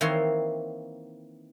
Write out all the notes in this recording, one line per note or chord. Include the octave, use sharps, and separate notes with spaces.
D#3 E3 A#3 C4 C#5 C6